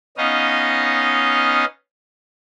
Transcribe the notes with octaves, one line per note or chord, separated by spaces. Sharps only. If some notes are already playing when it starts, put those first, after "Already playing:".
B3 C#4 D#4 D#5 F5